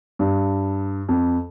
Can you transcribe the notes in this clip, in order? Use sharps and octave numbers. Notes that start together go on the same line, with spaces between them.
G2
F2